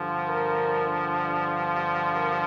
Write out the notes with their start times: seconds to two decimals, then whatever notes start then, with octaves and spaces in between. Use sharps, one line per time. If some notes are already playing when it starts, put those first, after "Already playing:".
Already playing: G2 D3 F3
0.27 A#4
2.15 A#4